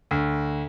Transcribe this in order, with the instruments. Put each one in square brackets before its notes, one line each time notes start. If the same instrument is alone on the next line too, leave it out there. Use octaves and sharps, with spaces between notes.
[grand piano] D2